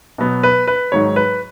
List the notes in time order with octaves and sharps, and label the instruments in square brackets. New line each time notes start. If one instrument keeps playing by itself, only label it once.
[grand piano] B2 F#3 B3
B4
B4
G#2 D#3 F#3 C#5
B4